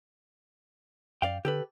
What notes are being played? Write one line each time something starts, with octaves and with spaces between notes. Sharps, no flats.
F#2 D5 F5 G5
D3 G4 A4 B4